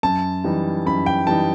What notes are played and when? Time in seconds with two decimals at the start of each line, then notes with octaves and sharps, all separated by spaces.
0.03 F#2 A5
0.44 E3 G3 D#4
0.86 F#2 B5
1.06 G5
1.27 E3 G3 D#4 A5